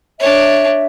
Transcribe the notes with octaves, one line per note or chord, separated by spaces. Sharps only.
D4 C#5 E5